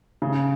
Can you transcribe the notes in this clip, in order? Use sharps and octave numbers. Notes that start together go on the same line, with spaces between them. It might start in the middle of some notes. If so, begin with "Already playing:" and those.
C#3